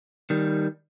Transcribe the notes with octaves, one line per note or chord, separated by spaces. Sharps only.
D#3 G3